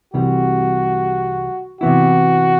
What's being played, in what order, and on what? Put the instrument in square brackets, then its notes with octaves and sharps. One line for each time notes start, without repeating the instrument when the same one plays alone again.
[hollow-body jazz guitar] C2 C3 E3 G3 [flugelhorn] F#4
[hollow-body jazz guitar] C3 E3 B3 E4 [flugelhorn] F#4